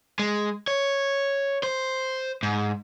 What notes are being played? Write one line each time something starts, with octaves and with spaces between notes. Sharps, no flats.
G#3
C#5
C5
G#2